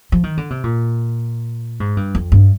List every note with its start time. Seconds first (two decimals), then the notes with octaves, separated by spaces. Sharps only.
0.12 F3
0.24 D#3
0.37 D3
0.50 C3
0.64 A#2
1.80 G#2
1.97 G2
2.15 F2
2.32 G2